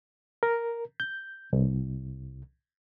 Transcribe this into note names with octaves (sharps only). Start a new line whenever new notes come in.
A#4
G6
C2